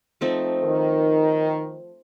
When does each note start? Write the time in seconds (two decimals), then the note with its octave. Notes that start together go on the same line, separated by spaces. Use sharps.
0.21 F3 A3 C4 D#4
0.63 D#3